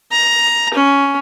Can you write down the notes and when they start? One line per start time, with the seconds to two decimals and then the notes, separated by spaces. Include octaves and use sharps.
0.12 A#5
0.74 C#4